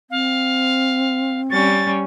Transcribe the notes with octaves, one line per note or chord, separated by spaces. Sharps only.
C4 F5
G3 C#4 A6